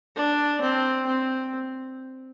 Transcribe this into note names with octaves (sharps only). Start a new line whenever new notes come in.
D4
C4
C4